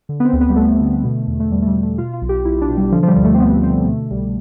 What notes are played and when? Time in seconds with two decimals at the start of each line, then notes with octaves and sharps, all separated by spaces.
0.09 D3
0.20 B3
0.25 C4
0.33 D2
0.41 B3
0.49 G3
0.56 D2 A3
0.80 D3
1.04 B2
1.27 E2
1.40 A3
1.51 E2 G3
1.62 A3
1.67 G3
1.74 B2
1.83 A3
1.98 B2 F4
2.13 F4
2.22 B1
2.29 G4
2.45 B1 E4
2.61 D4
2.69 B2
2.77 G3
2.92 D3 F3
3.03 F3
3.08 G3
3.15 D2
3.24 A3
3.34 C4
3.40 D2 B3
3.63 D3 C4
3.86 B2 A3
4.11 C2 G3